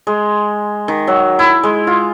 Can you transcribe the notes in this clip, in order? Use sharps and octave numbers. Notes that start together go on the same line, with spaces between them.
G#3
D#3
F#3
E4
G#3
F4